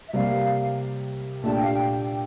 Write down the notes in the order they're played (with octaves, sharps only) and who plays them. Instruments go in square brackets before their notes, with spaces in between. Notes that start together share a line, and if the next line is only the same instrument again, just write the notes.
[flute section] E5
[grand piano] C3 G3 A#3 [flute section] F5
[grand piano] A#2 A3 D4 G4 [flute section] A5
[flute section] G5
F5
G5
G5